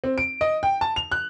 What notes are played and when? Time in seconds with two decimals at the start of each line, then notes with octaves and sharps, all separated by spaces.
0.04 C4
0.18 D7
0.41 D#5
0.63 G5
0.81 A5
0.96 F7
1.11 F#6